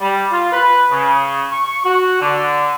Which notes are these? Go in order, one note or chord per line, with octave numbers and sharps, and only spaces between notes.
G3
F4
B4
C#3
C#6
F#4
D3